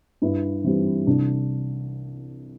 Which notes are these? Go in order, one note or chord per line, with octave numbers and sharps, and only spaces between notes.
G2 E4
E3 G3 C4
C2 D4